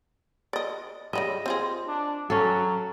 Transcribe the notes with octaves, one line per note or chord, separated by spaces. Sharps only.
D5 D#5
C#3 G3 D#5 E5
C4 F4 G#4
D4
F#3 C#4 A4